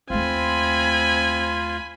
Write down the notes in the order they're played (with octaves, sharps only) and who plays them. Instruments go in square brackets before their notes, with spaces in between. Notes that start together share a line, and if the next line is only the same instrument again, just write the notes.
[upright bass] D#2 A3 [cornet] C4 [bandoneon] F4 [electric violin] G#5 B5